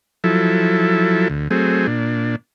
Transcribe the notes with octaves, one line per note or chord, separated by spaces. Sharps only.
F3 F#3 E4 A4
D2
F#3 A3 C4 G#4
A#2 D4